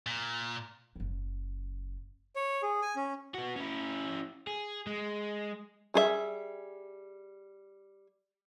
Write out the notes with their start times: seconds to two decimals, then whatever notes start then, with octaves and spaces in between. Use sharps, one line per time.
0.06 A#2
0.96 F#1 C#3
2.36 C#5
2.62 G#4
2.82 G#5
2.96 C#4
3.34 B3 F#4
3.56 C#4 E4
4.47 G#4
4.87 G#3
5.94 G3 G#4 A#4 E5